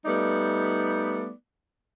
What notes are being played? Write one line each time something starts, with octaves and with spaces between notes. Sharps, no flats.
G3 A3 B3 D#4 D5